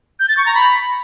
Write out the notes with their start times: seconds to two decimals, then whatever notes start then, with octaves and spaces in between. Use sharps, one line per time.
0.20 G6
0.28 A6
0.37 C#6
0.46 A#5
0.55 B5